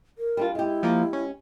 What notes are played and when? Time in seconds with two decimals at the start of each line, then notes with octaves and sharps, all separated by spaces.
0.18 A#4
0.37 G3 D4 F4
0.55 G#3 E4 G4
0.83 F3 A#3
1.13 C#4